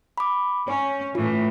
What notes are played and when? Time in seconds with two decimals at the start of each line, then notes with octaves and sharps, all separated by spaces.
0.18 B5 D6
0.68 C#4 C#5
1.15 A2 E3 F4